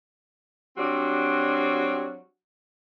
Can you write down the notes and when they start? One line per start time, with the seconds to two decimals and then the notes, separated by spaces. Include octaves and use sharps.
0.77 F#3 G3 C4 D4 F#4